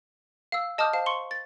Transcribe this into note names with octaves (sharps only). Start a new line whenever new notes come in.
F5 E6
D#5 A5 D6 D#6 F6 G6
C5 F5 A5
C6 C#6 C#7
A6